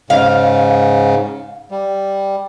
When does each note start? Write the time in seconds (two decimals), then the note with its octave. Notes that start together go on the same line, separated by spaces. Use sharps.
0.10 G#2 C#3 F5
1.71 G3